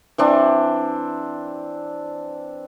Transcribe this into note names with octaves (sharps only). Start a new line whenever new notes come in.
E3 C4 D4